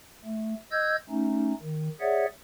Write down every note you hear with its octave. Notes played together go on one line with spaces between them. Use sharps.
A3
D#5 E6 G6 G#6
A3 C#4 D#4
D#3
G#4 C#5 D5 E5 F#5